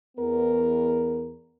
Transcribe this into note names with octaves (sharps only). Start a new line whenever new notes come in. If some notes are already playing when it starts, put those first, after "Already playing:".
E2 B3 A#4